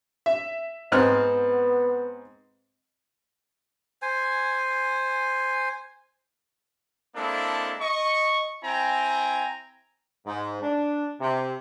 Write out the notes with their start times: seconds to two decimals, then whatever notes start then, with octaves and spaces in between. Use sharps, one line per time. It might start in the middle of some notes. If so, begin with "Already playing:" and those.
0.26 E5
0.92 G#2 B3 C4 F6
4.02 C5 G#5
7.16 G#3 A#3 C4 D4 E4 A4
7.81 D#5 C#6
8.64 C4 E4 G5 G#5 A#5
10.26 G#2
10.61 D4
11.20 C3